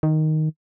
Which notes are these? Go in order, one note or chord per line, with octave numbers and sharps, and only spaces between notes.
D#3